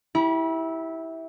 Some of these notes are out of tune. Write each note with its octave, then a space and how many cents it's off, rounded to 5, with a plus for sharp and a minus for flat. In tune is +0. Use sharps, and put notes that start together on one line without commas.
E4 -15 G4 +0 B5 -35